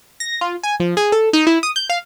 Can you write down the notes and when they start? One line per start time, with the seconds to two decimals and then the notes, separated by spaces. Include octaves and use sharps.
0.20 A#6
0.41 F4
0.63 G#5
0.80 F3
0.97 G#4
1.12 A4
1.33 D#4
1.47 E4
1.63 D#6
1.76 G6
1.90 F5